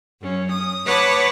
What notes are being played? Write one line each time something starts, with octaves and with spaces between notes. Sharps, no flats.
F#2 C#4
D#6
B4 C#5 F#5 A5 B5 D6